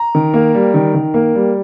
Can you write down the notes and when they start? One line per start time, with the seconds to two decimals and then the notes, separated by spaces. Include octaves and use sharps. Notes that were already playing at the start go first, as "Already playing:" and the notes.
Already playing: A#5
0.15 D#3
0.34 A#3
0.54 G3
0.74 D#3
0.94 D#3
1.14 A#3
1.35 G3